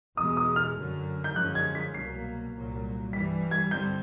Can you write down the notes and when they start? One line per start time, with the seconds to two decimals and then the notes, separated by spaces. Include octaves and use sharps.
0.17 E2 B2 G#3 D#6
0.37 D#6
0.56 F6
0.76 F#2 D3 F#3
1.24 G6
1.35 F#2 D3 F3 G#3 C#4 F#6
1.55 G#6
1.75 B6
1.94 C2 B2 F#3 A#3 C7
2.54 C2 A#2 F#3
3.13 G2 E3 G3 B6
3.51 G#6
3.71 G2 D3 G3 C4 G6